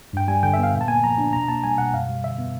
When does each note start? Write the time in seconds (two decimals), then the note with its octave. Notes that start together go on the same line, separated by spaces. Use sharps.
0.13 G2 G5
0.28 G3 G#5
0.43 D3 G5
0.54 B3 E5
0.63 F5
0.73 A#2
0.81 A5
0.88 A#3 G#5
1.03 F3 A#5
1.18 D4
1.33 B2 A#5
1.48 A#3 A5
1.63 G3 G#5
1.78 B2 F#5
1.93 F#2 F5
2.09 G3
2.24 D3 E5
2.38 B3